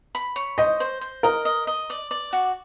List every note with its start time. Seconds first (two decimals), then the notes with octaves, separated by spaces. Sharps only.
0.15 B5
0.36 C#5
0.58 C5 D#5
0.80 C5
1.01 C5
1.23 A#4 D#5
1.45 D#5
1.67 D#5
1.90 D5
2.11 D5
2.33 F#4